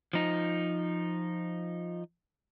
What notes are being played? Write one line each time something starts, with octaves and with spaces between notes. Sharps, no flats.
F3 D#4